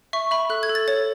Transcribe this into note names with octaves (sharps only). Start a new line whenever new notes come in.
E5 C#6
E5 B5
A4 F#6
G#6
A4
A6
C#5 A6